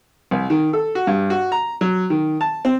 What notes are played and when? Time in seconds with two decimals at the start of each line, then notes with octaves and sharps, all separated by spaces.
0.31 C2
0.50 D#3
0.73 A4
0.95 F#4
1.07 G2
1.30 F#4
1.52 A#5
1.81 F#3
2.10 D#3
2.41 A5
2.65 C4